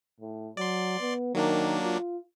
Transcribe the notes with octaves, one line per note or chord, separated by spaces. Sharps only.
A2
F#3 D5 C6
B3
D#3 F#3 A#3 D4
F4